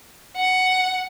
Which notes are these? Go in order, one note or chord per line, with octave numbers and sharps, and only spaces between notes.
F#5